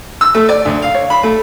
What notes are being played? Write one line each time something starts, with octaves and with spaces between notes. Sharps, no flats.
E6
A3
D5
D2
F5
C#5
B5
A3